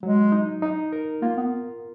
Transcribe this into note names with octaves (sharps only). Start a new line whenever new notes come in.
F#3 G#3
D#4
D#4
A#4
A#3 F4
B3